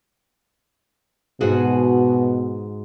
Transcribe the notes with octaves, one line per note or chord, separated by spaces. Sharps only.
G#2 B2 F#4 G#4